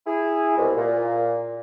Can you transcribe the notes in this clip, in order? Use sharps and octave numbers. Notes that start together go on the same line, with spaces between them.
E4 G#4 G#5
C2 B2 G#3
A#2